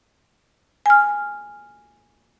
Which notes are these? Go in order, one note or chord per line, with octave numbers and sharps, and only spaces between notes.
G#5 F6